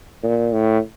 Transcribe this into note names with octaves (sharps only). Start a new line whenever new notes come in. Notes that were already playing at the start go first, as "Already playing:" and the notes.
A#2
A2